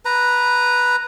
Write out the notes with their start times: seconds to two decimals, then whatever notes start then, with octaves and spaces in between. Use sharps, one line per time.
0.05 B4 A#5